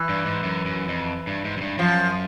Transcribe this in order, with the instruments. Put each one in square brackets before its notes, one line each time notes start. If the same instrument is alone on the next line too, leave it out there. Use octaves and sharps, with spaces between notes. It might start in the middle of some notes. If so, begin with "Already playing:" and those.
Already playing: [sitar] E3
[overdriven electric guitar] G2
G#2
F#2
F#2
F2
G2
G#2
F#2
G2
[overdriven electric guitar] F#2 [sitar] F3